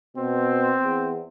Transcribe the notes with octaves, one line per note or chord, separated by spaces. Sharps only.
B2 C4
E2